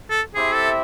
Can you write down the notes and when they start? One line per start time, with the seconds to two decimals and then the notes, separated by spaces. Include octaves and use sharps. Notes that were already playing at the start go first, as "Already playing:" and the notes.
0.10 A4
0.34 C4 E4 G4 G#4 C5 E5
0.53 A4